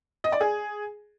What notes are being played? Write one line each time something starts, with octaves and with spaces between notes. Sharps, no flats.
D#5
D5
G#4